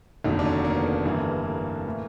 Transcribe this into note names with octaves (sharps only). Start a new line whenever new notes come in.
F1 D#2 D3 F#3 D#4
D4
C#4
A#3
B3
A#3
G1 G2 E3
A#3
A2 E3